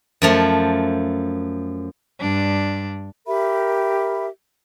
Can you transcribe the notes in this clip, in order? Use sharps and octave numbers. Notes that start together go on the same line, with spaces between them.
F#2 F3 A3
G2 D4
G4 A#4 E5 B5